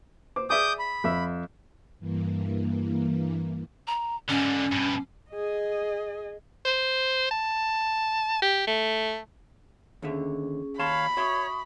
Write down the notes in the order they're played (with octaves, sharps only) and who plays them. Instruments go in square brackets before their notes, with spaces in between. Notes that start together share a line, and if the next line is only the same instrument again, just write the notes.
[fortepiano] C5 D6
[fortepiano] G#4 D5 E5 [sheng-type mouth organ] D6 D#6 G6
[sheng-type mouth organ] B5
[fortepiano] F2 E5
[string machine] G2 E3 A#3
[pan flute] A#5
[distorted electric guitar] G#2 D3 [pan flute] C#4
[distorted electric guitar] G2 B2
[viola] G#4 D#5
[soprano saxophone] C5
A5
G4
A3
[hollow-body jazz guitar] D#2 D3 E5 [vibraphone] C#4 G#4
[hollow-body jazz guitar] D#2 A5 C6 [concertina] C#5 F5 [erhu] B5
[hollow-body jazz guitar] F#4 E5 C6 [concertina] C#5 [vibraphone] C#6 D#6